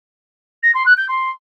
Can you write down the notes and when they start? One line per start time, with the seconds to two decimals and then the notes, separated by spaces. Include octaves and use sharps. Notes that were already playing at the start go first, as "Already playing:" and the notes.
0.63 A#6
0.74 C6
0.86 F#6
0.97 G6
1.08 C6